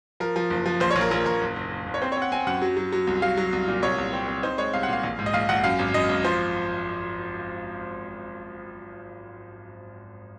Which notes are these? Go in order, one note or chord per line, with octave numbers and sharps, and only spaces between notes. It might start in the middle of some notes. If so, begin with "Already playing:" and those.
F3 A#4
F3
F#1
F3
A#1 C5
C#5
A#1
A#4
A#1 A#4
A#1 A#4
F#1
F#1
F#1
F#1
C#5
C4 C5
C#5
C4 F#5
C4 G#5
F#2 F#5
F#3
F#3
F#3
C2
F#3 F5
F#3
C2
A#2
C2 C#5
C2
C4
C4
D#4 C5
G#3 C#5
C2 F5
F#5
A#2 F5
A#1
G#2
D#5
A#1 F5
A#1 F#5
F#2 F5
G#1
F#2 D#5
G#1
F3 C5